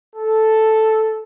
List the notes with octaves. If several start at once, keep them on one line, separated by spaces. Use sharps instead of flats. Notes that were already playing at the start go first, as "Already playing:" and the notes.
A4